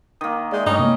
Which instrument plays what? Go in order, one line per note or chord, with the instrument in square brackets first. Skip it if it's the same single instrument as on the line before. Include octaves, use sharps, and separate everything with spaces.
[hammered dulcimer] D#3 A#3 [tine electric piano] D#6
[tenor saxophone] G#3 [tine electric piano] D5 E5 G6
[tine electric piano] G2 A3 [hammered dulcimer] G3 C#4 [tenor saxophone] D#4
[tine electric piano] C3 G#3 A#3